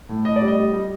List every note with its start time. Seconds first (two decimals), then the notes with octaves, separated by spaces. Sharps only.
0.09 A2
0.25 A2 D#5
0.36 D5
0.41 G3
0.48 D#5
0.57 G3
0.73 G3